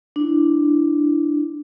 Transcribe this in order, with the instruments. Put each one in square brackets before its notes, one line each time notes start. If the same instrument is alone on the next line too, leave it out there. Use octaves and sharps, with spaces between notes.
[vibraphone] D4 E4